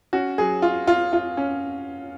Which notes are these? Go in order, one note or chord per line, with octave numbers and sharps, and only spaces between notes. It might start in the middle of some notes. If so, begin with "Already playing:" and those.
C#4 F#4
F#3 G#4
F4
F4
F4
C#4